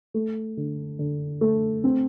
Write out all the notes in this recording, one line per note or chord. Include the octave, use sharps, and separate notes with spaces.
A3
D3
D3
A3
C4